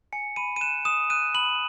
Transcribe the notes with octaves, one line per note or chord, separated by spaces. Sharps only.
G#5 C#7
B5 D#7
D#7
F#6 E7
D#6 E7
F#6 D#7
B5 F#7